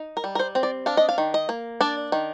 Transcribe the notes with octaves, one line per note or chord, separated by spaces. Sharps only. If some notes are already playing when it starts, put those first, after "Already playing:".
Already playing: D#4
A#4
G3
A#4
C5
C4
D5
D4 F5
D#5
F5
D#3
D#5
A#3
D4 D5
D#3